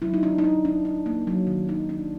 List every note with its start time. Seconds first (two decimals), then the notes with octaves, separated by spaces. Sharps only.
0.02 F#3 E4
0.14 D#4
0.23 D4
0.38 D#4
0.44 D4
0.65 D4
0.85 D4
1.06 A#3
1.27 F#3
1.47 D#3
1.68 F#3 D#4
1.89 D4